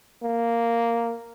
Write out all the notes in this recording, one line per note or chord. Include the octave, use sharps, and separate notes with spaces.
A#3